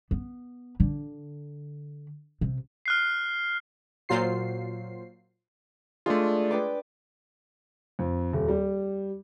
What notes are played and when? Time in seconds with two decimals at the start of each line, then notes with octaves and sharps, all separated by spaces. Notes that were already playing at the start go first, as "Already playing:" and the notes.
0.11 B3
0.80 D3
2.41 C3
2.86 F6 F#6 C7
4.09 A#2 F#3 F4 C5 C7
6.06 G#3 A3 D4 F4 D#6
6.51 B4 G5 D6
7.99 F2
8.33 D#1
8.48 G3